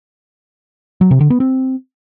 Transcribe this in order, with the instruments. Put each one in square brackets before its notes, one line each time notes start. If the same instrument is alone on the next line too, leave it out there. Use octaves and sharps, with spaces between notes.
[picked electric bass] F#3
C3
D3
B3
C4